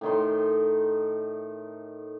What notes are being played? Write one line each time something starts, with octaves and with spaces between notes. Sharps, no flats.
A2 D#3 C6